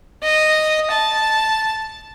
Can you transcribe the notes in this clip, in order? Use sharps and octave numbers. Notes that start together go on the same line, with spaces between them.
D#5
A5